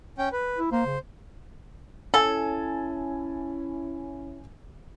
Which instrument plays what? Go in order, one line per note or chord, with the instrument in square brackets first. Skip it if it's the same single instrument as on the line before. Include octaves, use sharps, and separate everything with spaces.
[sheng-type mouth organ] C#4 G5
B4
[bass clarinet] E4
[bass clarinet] A#3 [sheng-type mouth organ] C5
[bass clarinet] C#3
[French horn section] C#4 E4 [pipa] A4 [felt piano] G#5 A6